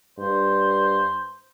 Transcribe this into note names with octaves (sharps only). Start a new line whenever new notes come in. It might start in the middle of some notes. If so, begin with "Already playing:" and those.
G2 C5